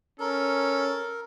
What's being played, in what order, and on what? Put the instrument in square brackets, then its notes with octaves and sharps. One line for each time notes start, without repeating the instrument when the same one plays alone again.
[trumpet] C#4 [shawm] A4 [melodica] A#4